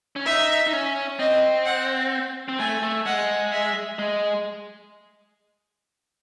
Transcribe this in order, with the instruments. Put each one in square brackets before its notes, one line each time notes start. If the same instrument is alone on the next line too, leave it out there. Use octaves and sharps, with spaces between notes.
[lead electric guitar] C#4
[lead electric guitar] D#4 [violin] E5
[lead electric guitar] D#4
C#4
[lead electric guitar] C4 [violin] D#5
[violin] F#5
[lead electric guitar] C4
[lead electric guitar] A3 [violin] G#5
[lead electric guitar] A3
[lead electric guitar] G#3 [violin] F#5
[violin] E5
[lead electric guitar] G#3